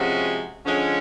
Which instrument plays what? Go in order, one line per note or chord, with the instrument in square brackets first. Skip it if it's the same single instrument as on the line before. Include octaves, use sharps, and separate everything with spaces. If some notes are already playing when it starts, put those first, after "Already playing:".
Already playing: [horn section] C3 F3 G#3 C#4 F#4
D3 F3 G#3 C#4